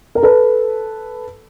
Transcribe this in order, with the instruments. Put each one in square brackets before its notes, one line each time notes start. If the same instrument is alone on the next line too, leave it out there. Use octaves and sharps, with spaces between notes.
[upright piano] A#4
A4 B4